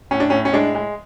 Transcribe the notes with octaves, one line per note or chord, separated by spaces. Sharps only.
A2 C#4
D4
A2 C#4
C#4
G#3 D4
G#3